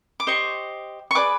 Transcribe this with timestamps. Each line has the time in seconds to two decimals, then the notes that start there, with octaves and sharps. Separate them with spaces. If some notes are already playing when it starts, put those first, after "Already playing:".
0.20 D6
0.27 G4 C5 D#5 C#6
1.11 C#6
1.15 G#4 B4 D5 D6